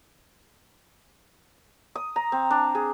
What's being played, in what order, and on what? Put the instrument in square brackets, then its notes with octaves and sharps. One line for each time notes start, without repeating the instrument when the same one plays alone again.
[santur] D#6
A#5
C4
D4
G#4